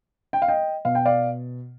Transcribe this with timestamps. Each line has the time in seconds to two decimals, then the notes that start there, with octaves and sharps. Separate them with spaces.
0.33 G5
0.42 F5
0.48 D#5 G5
0.85 B2 F5
0.95 G5
1.05 D5 F5